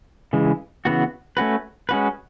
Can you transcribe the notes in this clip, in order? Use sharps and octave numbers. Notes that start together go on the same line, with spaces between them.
C#3 E3 G#3
C#3 E3 B3 F#4
A3 C#4 F#4 B4
G#3 C#4 F#4 B4